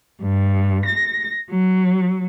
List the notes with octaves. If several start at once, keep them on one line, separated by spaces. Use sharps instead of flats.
G2
A#6
F#3